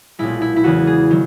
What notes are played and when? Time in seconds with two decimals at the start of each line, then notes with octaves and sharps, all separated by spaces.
0.19 B1 A#2 G#3 E4
0.42 E4
0.56 E4
0.64 E2 C#3 E3 F#4
0.87 G#4
1.10 D#3 F#3